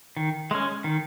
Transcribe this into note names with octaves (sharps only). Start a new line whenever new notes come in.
D#3
G#3 C#4
D#3